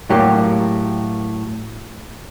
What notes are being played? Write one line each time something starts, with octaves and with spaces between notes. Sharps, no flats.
A2 F#3 A#3 G4